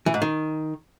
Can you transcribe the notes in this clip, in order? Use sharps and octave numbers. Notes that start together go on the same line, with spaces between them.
E3
G#2
D#3